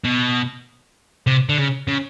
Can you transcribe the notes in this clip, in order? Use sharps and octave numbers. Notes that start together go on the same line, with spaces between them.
B2
C3
D3
C#3
C#3